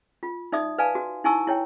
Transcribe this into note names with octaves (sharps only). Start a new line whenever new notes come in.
F4
D#4 D5 E5 D#6
B4 D5 F5 G#5 A5
F#4
D#4 E4 G#5 A5 C#6 E6
E4 C#5 G5